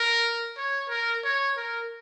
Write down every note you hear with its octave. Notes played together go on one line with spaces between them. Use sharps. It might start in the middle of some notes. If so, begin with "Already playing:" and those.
Already playing: A#4
C#5
A#4
C#5
A#4